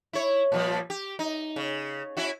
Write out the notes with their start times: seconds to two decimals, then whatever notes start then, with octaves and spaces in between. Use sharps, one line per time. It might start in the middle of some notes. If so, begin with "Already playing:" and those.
0.13 E4 C#5
0.52 A#2 F3 G3
0.90 G4
1.19 D#4
1.56 C#3
2.17 C#4 E4 F#4